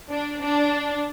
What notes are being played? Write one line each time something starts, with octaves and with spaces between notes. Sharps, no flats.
D4
D4